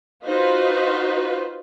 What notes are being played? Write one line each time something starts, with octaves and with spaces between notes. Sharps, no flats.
D#4 F4 F#4 B4 C5